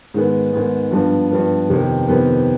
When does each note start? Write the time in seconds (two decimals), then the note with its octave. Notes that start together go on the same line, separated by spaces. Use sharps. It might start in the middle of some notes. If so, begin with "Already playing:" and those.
0.14 G#2 D#3 G#3 B3
0.52 G#2 D#3 G#3 B3
0.91 G2 F3 B3
1.31 G2 F3 B3
1.70 F2 C3 D#3 B3
2.08 F2 C3 D#3 B3